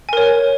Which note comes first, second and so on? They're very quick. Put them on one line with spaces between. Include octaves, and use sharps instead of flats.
G#5 A#4 C#5